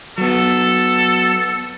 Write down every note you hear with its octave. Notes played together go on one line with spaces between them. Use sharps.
F#3 B3 A4